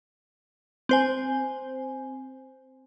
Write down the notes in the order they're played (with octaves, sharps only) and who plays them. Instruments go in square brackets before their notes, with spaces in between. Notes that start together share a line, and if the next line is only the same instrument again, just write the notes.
[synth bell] C4 C5 G#5